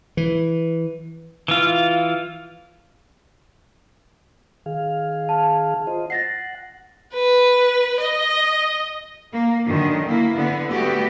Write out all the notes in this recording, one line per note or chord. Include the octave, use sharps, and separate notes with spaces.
E3
E3 F4
D#3 G#4 F5
A5
F4 C5 D#5
F#5 A6 A#6 C7
B4
D#5
A#3
F#2 D3 D#3
A#3 E4
D3 B3
G3 A3 B3 F#4 G4